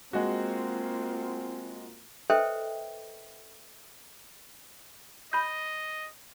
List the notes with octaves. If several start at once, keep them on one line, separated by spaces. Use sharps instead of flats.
G#3 A#3 C4 F4 F#4
A4 B4 C5 D#5 E5 G5
D#5 B5 G6